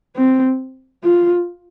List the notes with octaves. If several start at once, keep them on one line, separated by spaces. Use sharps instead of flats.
C4
F4